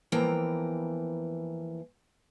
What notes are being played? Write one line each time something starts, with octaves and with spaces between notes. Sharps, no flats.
E2 E3 F3 A#3 G5 A#5